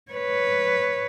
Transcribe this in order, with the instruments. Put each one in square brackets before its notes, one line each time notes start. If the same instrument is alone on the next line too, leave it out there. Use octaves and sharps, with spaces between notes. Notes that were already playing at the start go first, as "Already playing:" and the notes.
[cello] B4 C#5